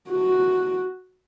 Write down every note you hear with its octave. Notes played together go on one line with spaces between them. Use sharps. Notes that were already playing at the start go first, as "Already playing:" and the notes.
F#4